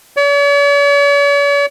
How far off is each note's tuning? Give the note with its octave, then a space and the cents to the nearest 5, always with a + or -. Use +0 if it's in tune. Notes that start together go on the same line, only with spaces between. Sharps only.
C#5 +45